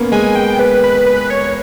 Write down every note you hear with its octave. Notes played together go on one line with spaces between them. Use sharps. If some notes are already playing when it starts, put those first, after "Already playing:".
Already playing: A#3 B3 C#4
G#3 G#5
G5
B4
B4
B4
C#5